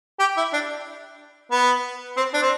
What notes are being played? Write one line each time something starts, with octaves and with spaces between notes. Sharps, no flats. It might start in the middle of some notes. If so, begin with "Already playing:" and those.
G4
E4
D4
B3
C4
D4
C4